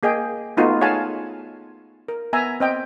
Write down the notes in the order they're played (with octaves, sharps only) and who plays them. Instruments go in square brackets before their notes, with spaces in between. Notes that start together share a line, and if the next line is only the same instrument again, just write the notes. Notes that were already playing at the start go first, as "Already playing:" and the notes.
[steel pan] A#3 G#4 D#5 G5
A3 B3 D#4 F4 F#4
G#4 C#5 F5 F#5 G#5 A5
A#4
B3 E5 G#5 A#5
C4 D#5 G5